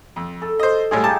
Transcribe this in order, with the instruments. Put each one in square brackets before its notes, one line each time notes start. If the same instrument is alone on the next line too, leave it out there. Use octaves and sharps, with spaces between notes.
[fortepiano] F2
[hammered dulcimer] A4
[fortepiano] C5 D#5
[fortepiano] A2 G3 G#3 [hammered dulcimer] F4 G#4
[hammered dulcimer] D#4 G4 [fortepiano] A5